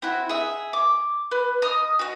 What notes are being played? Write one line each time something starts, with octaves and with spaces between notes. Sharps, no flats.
C4 E4 F#4
G#4 E5
D6
B4
D#5 D#6 F6
F#4 D#5